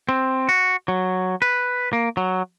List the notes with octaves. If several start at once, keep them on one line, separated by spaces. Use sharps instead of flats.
C4
F#4
F#3
B4
A#3
F#3